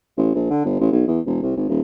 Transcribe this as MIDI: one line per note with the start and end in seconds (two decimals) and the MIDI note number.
0.17 0.33 33
0.35 0.47 34
0.50 0.62 50
0.65 0.79 31
0.80 0.87 33
0.92 1.03 35
1.07 1.20 40
1.26 1.37 28
1.42 1.54 36
1.57 1.65 32
1.69 1.81 27